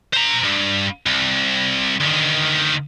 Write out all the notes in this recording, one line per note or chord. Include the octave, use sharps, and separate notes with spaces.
C5 A#5
G2
C2
D2 D#3